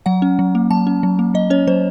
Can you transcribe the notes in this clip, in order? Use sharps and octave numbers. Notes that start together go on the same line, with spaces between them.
F#3 F#5
C#4
F#3
A#3
F#3 A5
C#4
F#3
A#3
F#3 D#5
C#4 C#5
F#3 C5